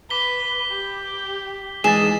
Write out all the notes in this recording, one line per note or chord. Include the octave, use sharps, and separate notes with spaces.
B4 D6 B6 G7
G4
G#2 E3 G#4 A4 D#5 A6 E7